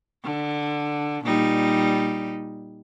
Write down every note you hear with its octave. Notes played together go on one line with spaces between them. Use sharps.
D3
A#2 G3 D#4